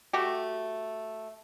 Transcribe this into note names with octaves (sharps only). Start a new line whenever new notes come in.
A3 F#4 G4